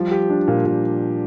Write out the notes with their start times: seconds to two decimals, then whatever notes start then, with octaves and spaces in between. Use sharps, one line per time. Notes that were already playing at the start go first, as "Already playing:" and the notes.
Already playing: F3 G3
0.11 G4
0.30 D4
0.48 A#2
0.65 A#2